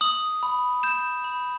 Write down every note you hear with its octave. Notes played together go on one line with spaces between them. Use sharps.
D#6 F#7
B5
G6 E7
B5